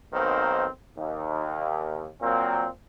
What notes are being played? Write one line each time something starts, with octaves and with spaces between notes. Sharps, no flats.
B1 D#3 A#3 C4 C5
D#2
A#2 F#3 A#3 C4